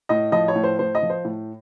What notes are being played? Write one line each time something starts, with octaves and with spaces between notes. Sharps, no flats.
A2 D#5
F3 D#5
C#5
A2
C5
A2 C5
D#5
F3
C5
A2